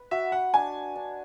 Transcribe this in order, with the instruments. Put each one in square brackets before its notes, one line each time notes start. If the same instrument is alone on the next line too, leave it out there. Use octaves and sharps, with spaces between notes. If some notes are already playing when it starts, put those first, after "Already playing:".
Already playing: [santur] B4
[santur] F#4 [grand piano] E5
[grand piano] F#5
[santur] D4 [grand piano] G#5
[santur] D4